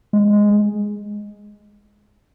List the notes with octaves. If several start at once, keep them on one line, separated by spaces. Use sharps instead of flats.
G#3